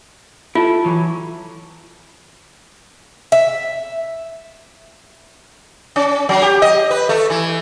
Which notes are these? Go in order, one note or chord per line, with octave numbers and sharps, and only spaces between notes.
E4 F4 A4
E3 F#3
E5
C#4
F#3
G4
D#5
B4
A3
E3